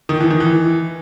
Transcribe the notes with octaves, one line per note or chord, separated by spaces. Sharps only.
D#3
E3
D#3
E3